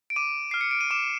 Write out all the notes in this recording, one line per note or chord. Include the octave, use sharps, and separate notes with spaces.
D7
D6 D#7
F6 C7
C#7
D7
D#7
D6 E7